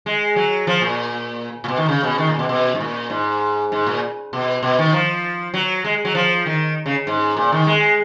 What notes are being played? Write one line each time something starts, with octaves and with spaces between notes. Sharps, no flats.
G#3
F#3
F3
A#2
A#2
B2
D#3
C#3
B2
D#3
A#2
B2
B2
G#2
A#2
G#2
G#2
A#2
B2
B2
D#3
F3
F#3
G#3
F#3
F3
D#3
C#3
G#2
A#2
D#3
G#3